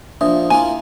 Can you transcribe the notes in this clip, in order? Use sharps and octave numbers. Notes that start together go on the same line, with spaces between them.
A#2 F3 D4 E5 D#6
A#3 E4 F4 G#5